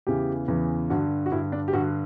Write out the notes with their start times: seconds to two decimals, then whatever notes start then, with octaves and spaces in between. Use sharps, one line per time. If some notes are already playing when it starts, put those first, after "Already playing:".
0.07 E2 C#3 E3 G4
0.48 E2 C#3 E3
0.90 G2 D3 F#4
1.26 F#4
1.32 G2 D3 E4
1.52 D4
1.68 G4
1.73 G2 D3 F#4